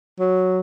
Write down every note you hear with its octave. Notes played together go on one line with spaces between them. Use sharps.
F#3